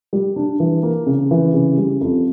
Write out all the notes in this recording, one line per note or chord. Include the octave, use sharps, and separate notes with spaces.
G3
D4
E3
A#3
C#3
E3
C#3
G3
F2